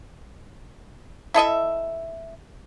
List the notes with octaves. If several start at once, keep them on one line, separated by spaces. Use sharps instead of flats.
E4 A4 D#5 E5